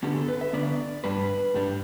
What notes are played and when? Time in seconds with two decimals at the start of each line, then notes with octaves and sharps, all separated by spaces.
0.03 D3 B3 D4 G4
0.16 A4
0.29 B4
0.41 E5
0.53 D3 B3 D4 D5
1.04 G2 G3 D4 B4
1.54 G2 G3 D4